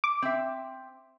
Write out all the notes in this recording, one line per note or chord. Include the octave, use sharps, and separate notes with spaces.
D6
C4 E5